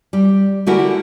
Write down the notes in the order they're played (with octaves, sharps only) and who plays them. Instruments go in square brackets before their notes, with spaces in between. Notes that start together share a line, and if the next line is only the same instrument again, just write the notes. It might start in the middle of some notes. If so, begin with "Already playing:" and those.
[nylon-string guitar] G3
D3 G#3 E4 F#4 G4 A#4